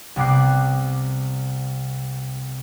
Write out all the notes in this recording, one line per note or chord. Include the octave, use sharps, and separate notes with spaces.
C2 C3 B3 D6 F#6 C7